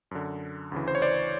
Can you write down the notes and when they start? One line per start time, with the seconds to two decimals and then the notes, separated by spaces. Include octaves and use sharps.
0.11 F#2 D3
0.72 D2 C#3 E3
0.88 C5
0.95 C#5
1.02 C5 D5